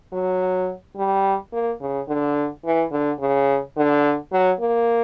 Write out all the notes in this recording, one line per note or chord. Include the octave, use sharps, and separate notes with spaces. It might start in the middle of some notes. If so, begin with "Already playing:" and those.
F#3
G3
A#3
C#3
D3
E3
D3
C#3
D3
F#3
A#3